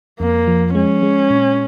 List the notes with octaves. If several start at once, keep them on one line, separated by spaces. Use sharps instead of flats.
F2 A#3
F3
G#3 C#4
G#3
A#2